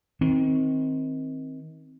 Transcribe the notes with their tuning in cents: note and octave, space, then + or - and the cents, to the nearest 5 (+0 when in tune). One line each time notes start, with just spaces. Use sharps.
D#3 +30 C4 +10